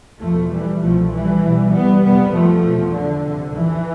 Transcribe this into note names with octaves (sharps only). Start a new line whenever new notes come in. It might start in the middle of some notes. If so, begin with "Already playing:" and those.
E2 B2 F3 A3
E3 G3
C2 B2 F3 A3
E3 G3
E2 B2
G3 B3
F2 C3 G3 B3
F3 A3
E2 B2
D3
F2 C3
E3